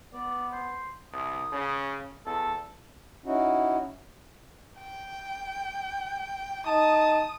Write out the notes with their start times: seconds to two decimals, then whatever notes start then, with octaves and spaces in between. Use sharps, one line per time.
0.13 B3 D5
0.52 C5
1.13 C2 D#6
1.52 C#3
2.26 E2 A4
3.25 C#4 D#4 E4 F#4
4.78 G5
6.67 D#4 A5 D#6